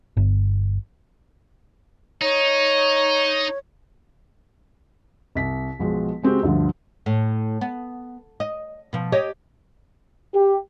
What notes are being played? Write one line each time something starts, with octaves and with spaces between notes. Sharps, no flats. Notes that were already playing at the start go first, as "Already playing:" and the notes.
G1
D#4 C#5
C2 B6
B1 F3 G#3 F#4
C#3 G#3 C4 F#4 G4
D2 G2 D3 F3
A2
B3
D#5
B2 F3
G4 C#5 D#5
G4